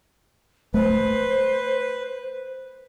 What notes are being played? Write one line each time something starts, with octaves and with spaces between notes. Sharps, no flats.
A3 B4 C5